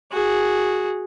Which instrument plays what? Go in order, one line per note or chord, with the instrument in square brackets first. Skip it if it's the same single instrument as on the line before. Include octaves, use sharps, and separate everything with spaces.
[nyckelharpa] F#4 G#4